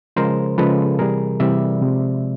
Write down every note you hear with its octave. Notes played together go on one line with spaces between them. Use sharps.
C#3 F3 G#3 A#4 C5
C#3 F3 G#3 A4 B4
C3 E3 G3 G#4 A#4
C3 E3 G3 D5 E5
C3 F3 G#3